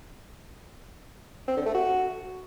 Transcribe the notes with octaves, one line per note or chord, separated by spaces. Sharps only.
C4
D3
A3
F#4